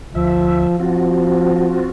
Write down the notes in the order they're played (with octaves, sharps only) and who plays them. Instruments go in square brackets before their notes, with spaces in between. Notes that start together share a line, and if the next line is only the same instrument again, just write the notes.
[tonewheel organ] D2 E5 [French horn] F3
[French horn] F3 [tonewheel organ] C4 F4 F#4